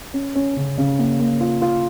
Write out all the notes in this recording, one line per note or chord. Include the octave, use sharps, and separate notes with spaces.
C#4
C#4
C#3
C#3
A#3
A#3
F4
F4